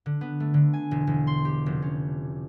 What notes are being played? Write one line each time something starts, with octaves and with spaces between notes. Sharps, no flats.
D3
B3
A3
D3
G#5
E1
E1
C6
G4
F1
C#4